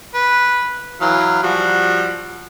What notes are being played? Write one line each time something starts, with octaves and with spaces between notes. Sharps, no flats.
B4
E3 F#3 F5
F3 G3 F#4